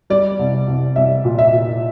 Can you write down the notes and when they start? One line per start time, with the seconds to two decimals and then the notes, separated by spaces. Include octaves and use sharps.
0.10 G3 D5
0.39 C2
0.67 C2
0.96 C2 E5
1.25 A#2
1.39 E5
1.53 A#2